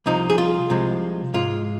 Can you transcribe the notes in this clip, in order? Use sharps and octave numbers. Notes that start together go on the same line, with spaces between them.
C2 C3 F3 D#4
G#4
F4
C2 C3 F3 G#3
G#2 G#3 F4